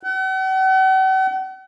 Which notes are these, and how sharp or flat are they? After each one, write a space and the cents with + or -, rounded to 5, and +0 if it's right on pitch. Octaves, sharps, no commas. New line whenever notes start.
F#5 +45